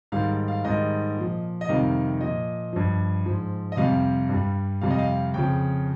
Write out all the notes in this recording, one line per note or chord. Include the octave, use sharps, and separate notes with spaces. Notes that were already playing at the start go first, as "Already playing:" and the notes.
G#2 D#3 G3 F5
F5
G#2 D#3 G3 D#5
A#2 F3
D#5
F2 C3 D#3 G3 F5
A#2 F3 D#5
G2 F3
G#2 F3
D#5
F2 C3 G3 F5
G2 G3
F2 C3 G3 F5
D#5
F5
F2 C#3 F3 G5